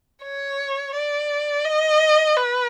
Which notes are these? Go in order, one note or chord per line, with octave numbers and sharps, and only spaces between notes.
C#5
D5
D#5
B4